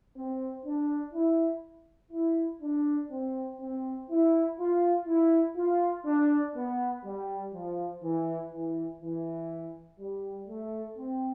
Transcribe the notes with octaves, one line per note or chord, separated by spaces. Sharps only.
C4
D4
E4
E4
D4
C4
C4
E4
F4
E4
F4
D4
B3
G3
F3
E3
E3
E3
G3
A3
C4